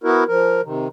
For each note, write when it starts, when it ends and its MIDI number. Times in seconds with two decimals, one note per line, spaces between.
0.04 0.24 59
0.04 0.24 64
0.04 0.24 66
0.04 0.24 70
0.28 0.61 53
0.28 0.61 70
0.63 0.88 48
0.63 0.88 51